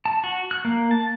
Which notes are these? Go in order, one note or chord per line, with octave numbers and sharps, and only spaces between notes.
A5
F#4
F#6
A#3
A5